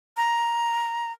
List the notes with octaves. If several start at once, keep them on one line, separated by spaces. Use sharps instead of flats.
A#5